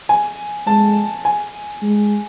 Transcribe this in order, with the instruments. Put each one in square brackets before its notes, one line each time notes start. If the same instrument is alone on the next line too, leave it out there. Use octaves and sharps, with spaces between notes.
[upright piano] G#5
[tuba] G#3 [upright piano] A5
[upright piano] G#5
[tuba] G#3